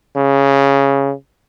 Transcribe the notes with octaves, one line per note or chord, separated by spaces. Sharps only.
C#3